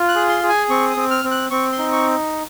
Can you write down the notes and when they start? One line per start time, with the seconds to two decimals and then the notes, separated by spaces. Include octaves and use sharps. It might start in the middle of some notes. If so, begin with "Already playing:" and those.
Already playing: F4
0.08 F#6
0.15 G#4
0.29 C6
0.43 G#4
0.49 G#5
0.70 C4 C#6
0.90 D#6
0.97 C4
1.11 F6
1.24 C4
1.31 F#6
1.51 C4 C#6
1.72 C6
1.79 D#4
1.92 C#6